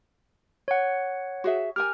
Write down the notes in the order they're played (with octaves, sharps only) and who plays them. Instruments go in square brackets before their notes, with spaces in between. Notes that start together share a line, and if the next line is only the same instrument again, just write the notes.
[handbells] C#5 F#5
[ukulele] F#4 G#4 E5
[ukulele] G4 A#4 G#5 [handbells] F6